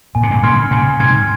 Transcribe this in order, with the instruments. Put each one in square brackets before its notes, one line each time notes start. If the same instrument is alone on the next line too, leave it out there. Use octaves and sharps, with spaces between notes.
[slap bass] A#2 [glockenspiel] G#5
[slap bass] C3
G2 A#2
[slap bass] A#2 C#3 [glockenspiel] C6 F6 G#6
[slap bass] A#2 C#3 [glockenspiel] G#5
[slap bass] G#2 C3 [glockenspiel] C6 F6 G#6